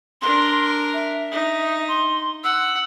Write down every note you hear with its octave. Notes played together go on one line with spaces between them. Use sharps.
D4 A#4 C6
E5
D#4
C6
F#5 E6